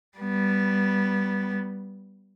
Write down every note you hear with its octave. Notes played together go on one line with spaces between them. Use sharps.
G3 B3